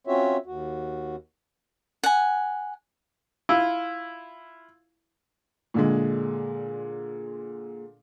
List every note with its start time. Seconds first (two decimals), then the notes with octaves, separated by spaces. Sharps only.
0.07 C4 C#4 F4 F#4 C#5 E5
0.46 D#2 F#4
2.03 F#5 G#5
3.49 E4 F4
5.74 A#2 D3 G#3